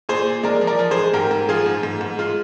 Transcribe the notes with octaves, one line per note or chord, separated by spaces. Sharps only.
A#2 G#4 C5
A#2
G#3 A#4 D5
F3
A#4 D5
F3
G#4 C5
G#3
G#2 G4 A#4
G#2
F3 F4 G#4
G#2
G#2
G#2
G#3 F4